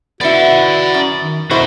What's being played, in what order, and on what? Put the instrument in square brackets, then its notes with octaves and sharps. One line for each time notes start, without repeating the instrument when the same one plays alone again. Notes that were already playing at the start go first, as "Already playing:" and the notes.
[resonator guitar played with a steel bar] B3 E4 [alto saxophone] F#4 [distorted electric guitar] D5 F#5
[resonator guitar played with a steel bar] F#2
[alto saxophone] D#3
[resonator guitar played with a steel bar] B2 C5 [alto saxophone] E4 [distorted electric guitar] F#4 A#4